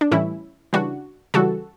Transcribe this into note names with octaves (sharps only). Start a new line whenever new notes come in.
D4
A2 E3 G3 C#4 E4
C#3 E3 G3 D4 F#4
C#3 E3 G3 F#4 A4